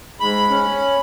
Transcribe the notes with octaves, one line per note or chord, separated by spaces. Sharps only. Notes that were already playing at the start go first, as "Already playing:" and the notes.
G#2 B5
C#4